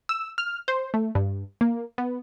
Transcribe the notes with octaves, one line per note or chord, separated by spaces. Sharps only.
E6
F6
C5
A3
G2
A#3
B3